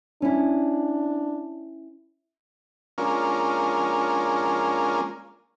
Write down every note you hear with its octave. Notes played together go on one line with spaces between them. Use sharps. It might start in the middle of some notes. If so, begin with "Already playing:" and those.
C#4 D4 E4
G#3 A#3 C#4 D4 F4 A#4